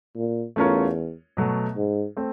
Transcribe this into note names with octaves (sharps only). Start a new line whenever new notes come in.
A#2
E2 A3 C#4 F4 A#4 C#5
B2 F#3 A3
G#2
A3 C4